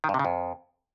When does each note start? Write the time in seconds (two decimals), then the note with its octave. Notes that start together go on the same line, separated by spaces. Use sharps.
0.04 D#3
0.09 G2
0.14 C3
0.19 C#3
0.25 F2